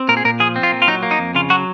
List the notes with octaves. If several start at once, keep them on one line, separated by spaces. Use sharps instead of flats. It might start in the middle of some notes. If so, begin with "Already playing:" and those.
Already playing: C4
A#2 A#4
G#4
A#2 A#4
F3 G#4
C4
F4
A#2
F4
F#3 D#4
A#3
D#4
F2
C#3 F4
F#3 F#4